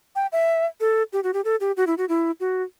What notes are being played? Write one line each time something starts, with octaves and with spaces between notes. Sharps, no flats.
G5
E5
A4
G4
F#4
G4
A4
G4
F#4
E4
F#4
E4
F#4